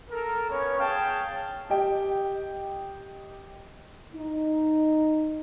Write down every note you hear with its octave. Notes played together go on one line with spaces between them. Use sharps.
A4 A#4
B3 C#4 C#5
G#4 C#5 F5 G5 A5
G4 D#5 G5
D#4